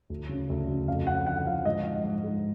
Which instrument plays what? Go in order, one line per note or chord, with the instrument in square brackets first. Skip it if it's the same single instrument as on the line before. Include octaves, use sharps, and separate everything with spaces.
[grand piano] D2
C#3
D2
C#3
F2 F5
F2 F#5
D3 F#5
F3 F5
G#2 D#5
G#2
G#2
G#3